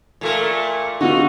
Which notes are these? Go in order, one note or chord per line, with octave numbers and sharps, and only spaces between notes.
A#2 A3 A#4
D3 B3 D#4 F4 F#4